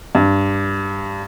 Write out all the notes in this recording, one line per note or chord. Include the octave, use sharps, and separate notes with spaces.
G2